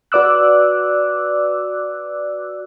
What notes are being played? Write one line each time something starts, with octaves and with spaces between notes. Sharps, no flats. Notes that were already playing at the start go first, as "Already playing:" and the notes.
F#4 B4 D5 D6 E6 F#6